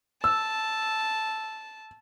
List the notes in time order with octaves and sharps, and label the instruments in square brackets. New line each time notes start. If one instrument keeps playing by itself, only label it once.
[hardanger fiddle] A5 [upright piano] E6